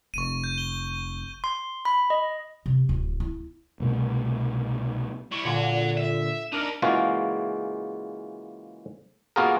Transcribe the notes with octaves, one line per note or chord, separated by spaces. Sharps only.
F1 C#6 D#7
G6
G7
C6
B5
D#5
C3
D1
E4
C2 B2 A3
G3 E4 C#6
A#2 D3 C#5 F#5
E5
A#3 D4 D#4 A#4
C#3 E3 G#3 A#3 F4 F#4
A#3 B3 F4 F#4 G#4 A#4